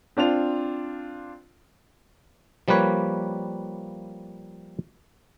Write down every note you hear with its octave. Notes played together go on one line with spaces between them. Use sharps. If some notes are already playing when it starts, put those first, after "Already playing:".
C4 D4 F4 F7
F3 G3 A#3 B4 C#5